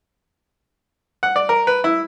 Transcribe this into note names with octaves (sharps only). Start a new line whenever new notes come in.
F#5
D5
A#4
B4
E4